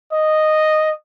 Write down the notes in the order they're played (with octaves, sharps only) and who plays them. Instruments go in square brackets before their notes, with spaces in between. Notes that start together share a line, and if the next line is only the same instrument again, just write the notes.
[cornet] D#5